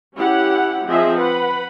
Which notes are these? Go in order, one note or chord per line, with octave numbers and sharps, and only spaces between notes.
C#4 E4 G4 F#5
F3 C4 G#4 D#5 E5
B4 F#5 B5